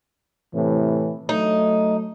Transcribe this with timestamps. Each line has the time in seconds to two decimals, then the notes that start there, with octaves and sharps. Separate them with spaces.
0.54 A2 C3 E3
1.29 F#3 A3 D#4